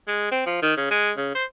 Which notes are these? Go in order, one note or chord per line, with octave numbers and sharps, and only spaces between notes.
G#3
C4
F3
D#3
C#3
G#3
C#3
C5